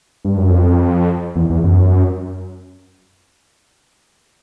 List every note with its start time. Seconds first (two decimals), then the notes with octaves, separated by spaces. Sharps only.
0.25 G2
0.37 F#2
0.50 F2
1.36 E2
1.50 E2
1.64 F#2